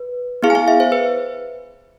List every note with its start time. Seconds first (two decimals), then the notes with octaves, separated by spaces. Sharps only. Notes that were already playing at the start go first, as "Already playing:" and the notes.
Already playing: B4
0.43 B3 E4 G#4 F5
0.50 G#5
0.55 F5
0.68 E5
0.80 C5
0.92 B4